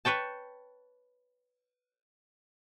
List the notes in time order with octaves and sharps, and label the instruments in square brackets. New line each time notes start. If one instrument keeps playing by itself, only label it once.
[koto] B4 C#5 G5 A5